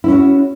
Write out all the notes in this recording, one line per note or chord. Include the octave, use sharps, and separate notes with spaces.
C#4 E4 F#4